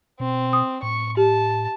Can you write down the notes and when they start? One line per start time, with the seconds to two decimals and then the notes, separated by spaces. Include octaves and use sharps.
0.20 B2 C4
0.53 D#6
0.83 A2 C#6
1.17 G4 A5